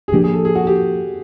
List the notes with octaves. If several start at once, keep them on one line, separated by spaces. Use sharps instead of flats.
G#4
A2 F3 A#3 D4 G4
G#4
A4
G#4
F#4
G4